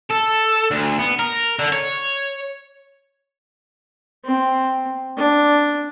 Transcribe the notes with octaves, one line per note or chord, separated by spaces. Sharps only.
A4
D2
B3
A#4
D3
C#5
C4
D4